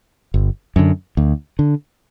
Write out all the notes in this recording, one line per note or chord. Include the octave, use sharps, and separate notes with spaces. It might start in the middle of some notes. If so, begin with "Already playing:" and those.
G1
F#2 D3
D2
D3